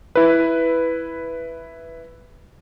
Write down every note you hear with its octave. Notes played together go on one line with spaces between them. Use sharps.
E4 B4